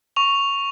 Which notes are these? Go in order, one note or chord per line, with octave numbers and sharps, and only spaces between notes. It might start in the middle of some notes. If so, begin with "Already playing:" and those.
C#6 F7